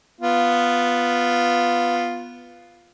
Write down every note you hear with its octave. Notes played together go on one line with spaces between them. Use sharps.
B3 F4